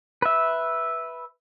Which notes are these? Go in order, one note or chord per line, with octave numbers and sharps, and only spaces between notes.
B4 E5